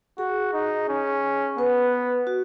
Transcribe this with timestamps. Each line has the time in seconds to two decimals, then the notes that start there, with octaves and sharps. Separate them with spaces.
0.18 F#4 G#4
0.53 D#4
0.89 C#4
1.58 B3 B4
2.27 F#4